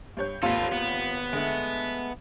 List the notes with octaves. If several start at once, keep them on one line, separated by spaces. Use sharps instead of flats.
G2 C#5 G6
G#1 D#2 F4 A4 B4
B3
D3 G#3 A3